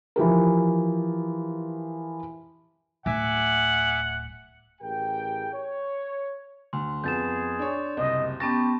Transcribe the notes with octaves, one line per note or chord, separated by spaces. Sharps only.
E3 F3 G4 A#4
D1 E5 F#5 G#5 D6
A1 G4 G#4 A#4 G5
C#5
D2 C6
F2 B3 G#4 G6 A6 E7
D4 C#5
F#1 C2 D#5
B3 C#4 G4 A5 C#6 A6 A#6